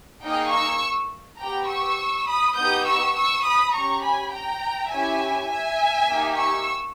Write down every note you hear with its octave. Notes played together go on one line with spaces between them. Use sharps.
A#3 D#4 G#4 D#5 G5
C#6 E6
B3 G4 G5 A#5
C#6 E6
B5 D#6
B3 D#4 G4 D#6 G6
C#6 E6
C#6 E6
B5 D#6
C#4 G4 A#5 C#6
G#5 B5
G5 A#5
C#4 E4 G4 E5 G#5
E5 G#5
A#3 D#4 G4
C#6 E6